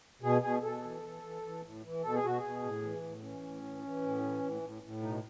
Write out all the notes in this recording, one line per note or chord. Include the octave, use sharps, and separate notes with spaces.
B2 G#4
B2 G#4
B2 A4
E3
E3
E3
E3
A2
E3
B2 A4
G#4
B2 F#4
B2 G#4
A2
E3
A2
E3 C#4
A2
E3
E3
A2
E3
A2
A2
A2
B2 D#4